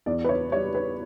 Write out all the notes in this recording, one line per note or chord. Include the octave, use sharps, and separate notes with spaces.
E2 D5
B4
C#5
G3 C#5
B4